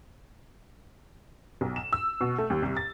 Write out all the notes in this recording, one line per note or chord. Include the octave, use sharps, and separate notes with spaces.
B1
E7
E6
B2
A3
D#2
C2
A6